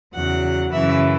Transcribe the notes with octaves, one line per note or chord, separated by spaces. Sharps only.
E2 C#3 F#3 F#5
F#2 C#3 E3 E5